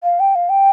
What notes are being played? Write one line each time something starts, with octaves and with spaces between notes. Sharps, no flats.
F5
G5
F5
G5